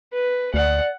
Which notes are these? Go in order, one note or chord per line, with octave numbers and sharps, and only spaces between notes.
B4
D2 D5 F#5